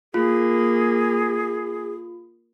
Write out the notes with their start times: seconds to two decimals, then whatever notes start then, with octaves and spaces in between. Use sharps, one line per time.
0.14 A#3 F4 G#4